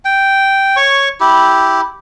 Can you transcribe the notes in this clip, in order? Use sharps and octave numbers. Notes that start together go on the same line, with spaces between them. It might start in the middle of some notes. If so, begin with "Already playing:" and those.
G5
C#5 C#6
E4 G4